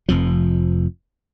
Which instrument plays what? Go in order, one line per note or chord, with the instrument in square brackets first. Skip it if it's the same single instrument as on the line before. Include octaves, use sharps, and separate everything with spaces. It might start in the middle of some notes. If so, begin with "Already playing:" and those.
[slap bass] F1 F2 F3